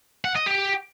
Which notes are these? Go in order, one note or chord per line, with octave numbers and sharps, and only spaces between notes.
F#5
D#5
G4